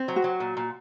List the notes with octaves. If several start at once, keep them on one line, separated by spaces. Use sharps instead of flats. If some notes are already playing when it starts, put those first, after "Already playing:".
Already playing: C4
F#3
F#4
F#3
A#2
A#2